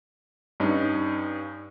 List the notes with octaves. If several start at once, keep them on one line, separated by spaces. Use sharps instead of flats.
G2 C#4 D#4